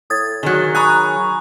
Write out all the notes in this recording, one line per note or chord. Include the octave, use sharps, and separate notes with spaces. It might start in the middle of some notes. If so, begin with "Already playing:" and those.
A2 D#6 G#6 A6
D#3 F#3 G#4
G#5 A#5 B5 C#6 D#6 F#6